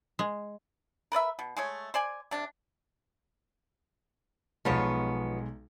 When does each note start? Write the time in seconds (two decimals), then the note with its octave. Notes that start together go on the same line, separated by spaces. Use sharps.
0.19 G#3
1.12 A#4 B4 D5 E5
1.39 B2
1.57 G#3 A3 C#5
1.94 C5 D5 G#5
2.31 C3 D4
4.65 B1 F3 G#3 B3 C#5